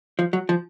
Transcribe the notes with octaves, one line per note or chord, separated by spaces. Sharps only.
F3
F#3
F3